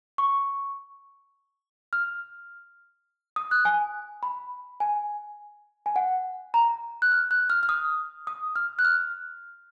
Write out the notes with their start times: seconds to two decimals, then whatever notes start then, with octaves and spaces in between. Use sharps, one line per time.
0.18 C#6
1.93 F6
3.36 D#6
3.51 F#6
3.65 G#5
4.23 B5
4.80 G#5
5.86 G#5
5.96 F#5
6.54 A#5
7.02 F#6
7.12 F6
7.31 F#6
7.50 F6
7.63 F6
7.69 D#6
8.27 D#6
8.56 F6
8.79 F#6
8.85 F6